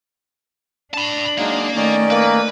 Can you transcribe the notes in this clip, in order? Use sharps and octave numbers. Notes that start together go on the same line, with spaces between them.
D4 A5 B5
F#3 G#3 A#3 D#4
D#3 A3 C#4 D#4 D5
A#3 B4